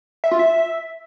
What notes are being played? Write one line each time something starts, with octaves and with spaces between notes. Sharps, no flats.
E5
F4
E5